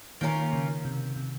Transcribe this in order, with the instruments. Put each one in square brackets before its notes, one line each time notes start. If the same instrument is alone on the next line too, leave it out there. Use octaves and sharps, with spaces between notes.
[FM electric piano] D#3 [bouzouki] A#3 C#4 F4 A#4
[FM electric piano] C#3
C3
C3